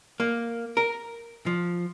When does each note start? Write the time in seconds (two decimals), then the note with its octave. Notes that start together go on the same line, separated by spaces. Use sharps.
0.20 A#3
0.77 A#4
1.46 F3